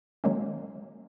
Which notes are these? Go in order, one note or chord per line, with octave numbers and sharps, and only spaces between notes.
D#3 F#3 G#3 A#3 C#4